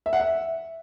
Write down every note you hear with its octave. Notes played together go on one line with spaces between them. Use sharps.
E5
F#5
E5